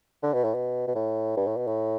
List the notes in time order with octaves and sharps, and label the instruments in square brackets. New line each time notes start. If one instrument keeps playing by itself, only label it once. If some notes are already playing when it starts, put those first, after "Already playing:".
[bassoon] D3
B2
A2
B2
B2
A2
G2
A2
B2
A2